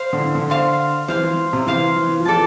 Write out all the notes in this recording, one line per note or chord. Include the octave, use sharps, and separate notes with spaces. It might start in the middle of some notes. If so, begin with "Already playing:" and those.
Already playing: C5 F5 C6
D3
E3
D3
C5 F5 C6
E3 C5 F5 C6
E3
C3
E3 C5 F5 C6
E3
F3
E3 A4 D5 A5